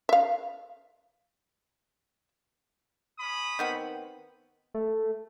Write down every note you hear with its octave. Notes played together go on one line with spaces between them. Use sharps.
E5 F5
C#4 B5 D#6
D#3 B3 C4
A3